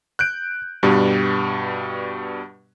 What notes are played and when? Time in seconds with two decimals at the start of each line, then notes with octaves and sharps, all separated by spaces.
0.19 F#6 G6 D7
0.83 G2 B2 G3